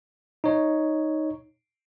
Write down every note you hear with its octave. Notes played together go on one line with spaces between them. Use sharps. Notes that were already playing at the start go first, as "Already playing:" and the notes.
D#4 C#5